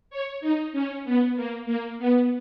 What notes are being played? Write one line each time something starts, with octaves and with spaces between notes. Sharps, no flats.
C#5
D#4
C#4
B3
A#3
A#3
B3